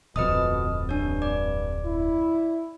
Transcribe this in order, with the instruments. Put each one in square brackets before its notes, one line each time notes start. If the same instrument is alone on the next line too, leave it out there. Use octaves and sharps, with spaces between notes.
[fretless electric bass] D1 F2 [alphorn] B2 [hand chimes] B4 D#5 D#6
[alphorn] G2 [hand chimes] D4 C#5
[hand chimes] D5 D6
[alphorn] E4